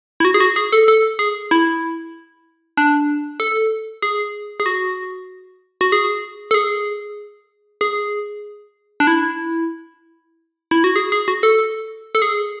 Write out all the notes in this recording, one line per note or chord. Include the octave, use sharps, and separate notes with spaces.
E4
F#4
G#4
F#4
G#4
A4
A4
G#4
E4
D4
A4
G#4
G#4
F#4
F#4
G#4
A4
G#4
G#4
D4
E4
E4
F#4
G#4
G#4
F#4
A4
A4
G#4